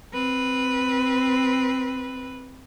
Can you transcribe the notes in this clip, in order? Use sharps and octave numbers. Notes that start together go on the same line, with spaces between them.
C4 B4